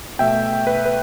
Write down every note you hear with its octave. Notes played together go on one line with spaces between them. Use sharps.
B2 A3 E5 G5
B4
B4